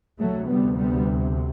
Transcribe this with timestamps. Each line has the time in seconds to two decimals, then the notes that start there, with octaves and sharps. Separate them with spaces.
0.19 D2 C3 F#3 A3
0.47 G3 B3
0.76 G3 B3